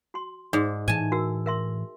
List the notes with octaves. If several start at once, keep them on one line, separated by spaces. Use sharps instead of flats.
F#4 C6
G#2 G#4 D5
A2 E3 G#5 A5
F#4 A#4 E6
A#4 E5 C6